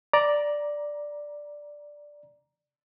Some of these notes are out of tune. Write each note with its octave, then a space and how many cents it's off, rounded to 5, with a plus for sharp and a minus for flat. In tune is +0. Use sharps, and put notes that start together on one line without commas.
D5 +0 A#5 +10